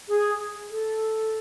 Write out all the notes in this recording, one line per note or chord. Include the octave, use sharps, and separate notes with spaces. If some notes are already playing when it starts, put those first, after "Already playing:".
G#4
A4